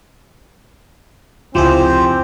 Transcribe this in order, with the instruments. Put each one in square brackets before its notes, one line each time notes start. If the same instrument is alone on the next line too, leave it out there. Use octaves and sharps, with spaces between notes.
[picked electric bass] F1 C#2 [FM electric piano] F3 E4 G#4 [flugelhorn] C4 [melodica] G4 C5